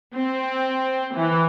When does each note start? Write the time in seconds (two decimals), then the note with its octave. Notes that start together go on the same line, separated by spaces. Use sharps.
0.15 C4
1.16 E3